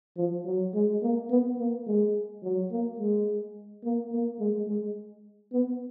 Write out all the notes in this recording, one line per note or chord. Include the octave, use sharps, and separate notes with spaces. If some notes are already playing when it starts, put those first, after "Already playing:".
F3
F#3
G#3
A#3
B3
A#3
G#3
F#3
A#3
G#3
A#3
A#3
G#3
G#3
B3